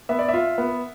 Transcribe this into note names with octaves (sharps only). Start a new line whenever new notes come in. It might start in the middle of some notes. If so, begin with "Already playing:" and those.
B3 E5
D5
E5
F4
B3